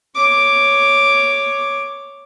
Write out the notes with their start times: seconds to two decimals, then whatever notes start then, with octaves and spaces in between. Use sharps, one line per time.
0.15 C#5 D6